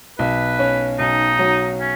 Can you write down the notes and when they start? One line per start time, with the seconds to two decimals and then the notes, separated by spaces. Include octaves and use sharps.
0.19 B1 B4
0.59 C#4
0.99 B1 D#4
1.39 F#3
1.80 C#4